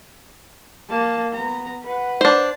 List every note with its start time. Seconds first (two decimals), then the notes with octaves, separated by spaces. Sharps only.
0.89 A#3 A5
1.33 B3 A#5
1.83 B4 F#5
2.21 D4 C5